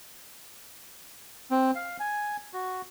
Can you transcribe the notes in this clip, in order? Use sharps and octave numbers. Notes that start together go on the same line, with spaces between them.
C4
F5
G#5
F#4